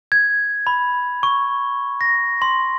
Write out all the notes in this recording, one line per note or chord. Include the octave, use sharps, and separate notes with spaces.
G#6
B5
C#6
A#6
C6